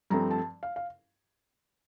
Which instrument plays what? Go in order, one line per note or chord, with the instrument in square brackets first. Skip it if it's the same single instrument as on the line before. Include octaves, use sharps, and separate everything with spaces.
[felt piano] G2 F3 A3 C4 A#5
A5
F5
F5